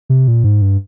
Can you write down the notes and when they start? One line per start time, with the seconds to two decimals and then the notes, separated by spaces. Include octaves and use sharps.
0.10 C3
0.28 A#2
0.44 G#2
0.62 G2